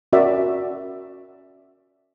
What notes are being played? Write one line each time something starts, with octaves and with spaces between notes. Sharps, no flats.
C#4 F#4 A#4 D5 E5